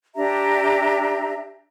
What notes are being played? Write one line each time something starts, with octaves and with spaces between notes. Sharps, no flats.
D4 G4 E5 A#5